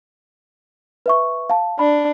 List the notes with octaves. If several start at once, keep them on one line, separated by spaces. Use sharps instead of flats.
B4 E5 C#6
F5 A5
D4 B5